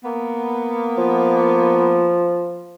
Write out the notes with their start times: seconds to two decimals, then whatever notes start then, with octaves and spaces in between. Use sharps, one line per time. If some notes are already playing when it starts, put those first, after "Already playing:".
0.04 A#3 B3
0.98 F3